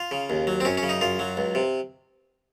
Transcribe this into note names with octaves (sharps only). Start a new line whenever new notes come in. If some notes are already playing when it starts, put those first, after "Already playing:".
Already playing: F4
C#3
D#2
F#3
C4
F#2 C#4
C#4
C#3
D#4
F#2 F4
F#3
C#2
C3